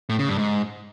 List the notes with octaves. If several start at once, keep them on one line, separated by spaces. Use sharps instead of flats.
A2
C#3
G2
G#2